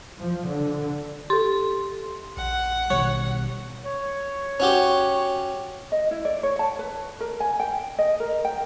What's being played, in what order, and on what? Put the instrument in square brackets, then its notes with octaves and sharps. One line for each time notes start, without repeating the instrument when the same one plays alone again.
[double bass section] F3
D3
[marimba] G4 A4 [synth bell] C6
[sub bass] A#1 [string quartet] F#5
[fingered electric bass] B2 D#3 G3 [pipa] C#5
[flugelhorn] C#5
[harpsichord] C#4 F#4 G4
[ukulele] D#5
E4
D5
C#5
A5
B4
A#4
G#5
G5
D#5
A#4
G5